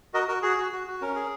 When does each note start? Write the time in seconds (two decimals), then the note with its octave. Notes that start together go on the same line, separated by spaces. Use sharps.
0.14 F#4 A#4 D#5
0.28 F#4 A#4
0.42 F#4 G#4
0.57 F#4
0.72 F#4
0.87 F#4
1.01 C#4 A#4
1.15 G#4